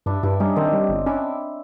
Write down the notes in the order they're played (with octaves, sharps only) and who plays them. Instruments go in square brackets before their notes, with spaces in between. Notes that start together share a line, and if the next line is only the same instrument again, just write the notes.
[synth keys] G2 [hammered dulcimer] D4 E4
[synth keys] G2 [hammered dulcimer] D4 E4
[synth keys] G3 [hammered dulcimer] C#4 D#4
[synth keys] D#3 [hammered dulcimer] C4 D4
[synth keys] G3
G1
[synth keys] C#4 [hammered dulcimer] D4 E4